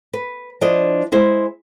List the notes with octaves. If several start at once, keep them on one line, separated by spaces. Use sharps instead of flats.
B4
F3 D4 E4 D#5
G#3 E4 C5